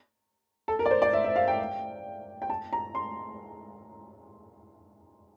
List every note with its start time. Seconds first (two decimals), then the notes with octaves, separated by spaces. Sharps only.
0.68 A4
0.79 A#4
0.86 D5
0.91 C5
1.02 D5
1.13 E5
1.24 E5
1.36 F5
1.48 G5
2.42 G5
2.50 A5
2.73 A#5
2.95 C6